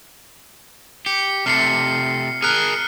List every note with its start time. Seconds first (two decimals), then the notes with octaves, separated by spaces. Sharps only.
1.06 G4 C#7
1.46 C3 A3 F6 C7 C#7
2.42 G#4 A#4 F6 F#6